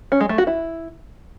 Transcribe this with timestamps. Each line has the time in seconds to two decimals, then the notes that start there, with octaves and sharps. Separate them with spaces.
0.12 C#4
0.21 G#3
0.29 A3
0.38 F#4
0.47 E4